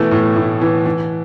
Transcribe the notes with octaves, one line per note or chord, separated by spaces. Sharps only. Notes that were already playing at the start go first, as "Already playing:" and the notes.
Already playing: B2 E3 A3
A2
A2
E3
E3